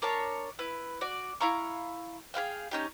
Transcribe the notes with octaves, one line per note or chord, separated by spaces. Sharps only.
D4 A#4 C#5 A5
E4 B4
F#4 D5
E4 F5 A#5 C#6
G#4 B4 F5 G5
C#4 D#4 G4